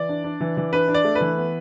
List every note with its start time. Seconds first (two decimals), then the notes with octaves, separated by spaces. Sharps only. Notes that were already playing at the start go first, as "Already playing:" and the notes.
Already playing: E3 D5
0.09 D4
0.24 D4
0.40 E3
0.57 E3
0.73 D4 B4
0.88 D4
0.94 D5
1.04 A3
1.15 B4
1.20 E3
1.37 B3